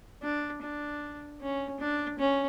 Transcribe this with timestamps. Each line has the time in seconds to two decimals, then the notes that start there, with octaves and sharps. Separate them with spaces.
0.23 D4
0.62 D4
1.41 C#4
1.80 D4
2.19 C#4